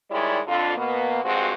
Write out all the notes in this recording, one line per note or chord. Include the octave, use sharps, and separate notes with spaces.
D#3 G3 G#3 E4 C#5 D5
F2 D3 F4
B2 A#3 B3
G2 F3 G#3 C4 F#4